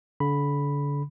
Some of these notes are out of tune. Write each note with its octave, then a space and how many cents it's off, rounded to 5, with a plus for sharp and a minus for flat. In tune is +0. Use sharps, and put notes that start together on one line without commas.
D3 -35 B5 +0